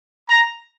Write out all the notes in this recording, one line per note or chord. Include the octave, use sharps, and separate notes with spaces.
A#5